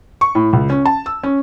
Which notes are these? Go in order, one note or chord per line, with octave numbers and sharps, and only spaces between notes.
C#6
A2
C#2
C#4
A5
E6
C#4